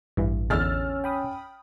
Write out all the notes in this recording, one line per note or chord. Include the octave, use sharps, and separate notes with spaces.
A1 G2 E3
E2 D3 C#4 E6 F6 A6
G5 B5 D#6